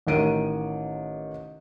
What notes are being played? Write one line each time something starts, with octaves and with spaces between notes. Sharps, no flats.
A1 D#3 D7 D#7